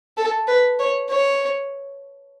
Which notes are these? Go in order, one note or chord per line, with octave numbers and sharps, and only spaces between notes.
A4
B4
C#5
C#5